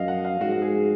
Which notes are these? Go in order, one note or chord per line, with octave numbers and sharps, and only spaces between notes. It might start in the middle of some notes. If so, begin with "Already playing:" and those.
Already playing: F#2 D#5 F5
F#5
F5
G#2 F#4
G#4